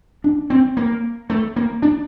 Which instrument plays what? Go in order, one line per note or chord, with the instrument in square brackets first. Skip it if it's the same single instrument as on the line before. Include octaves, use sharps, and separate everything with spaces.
[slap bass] D4
C4
A#3
A3
A#3
D4